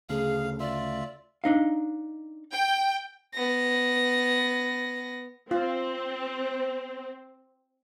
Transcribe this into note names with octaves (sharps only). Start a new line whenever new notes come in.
D2 C#3 A3 G#4 F5
F4 D5 E5
D4 D#4 F5
G5
B3 A#6
C4 F4